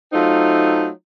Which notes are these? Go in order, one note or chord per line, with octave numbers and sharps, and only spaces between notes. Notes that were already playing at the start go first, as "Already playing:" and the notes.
F#3 A3 C4 D#4 F4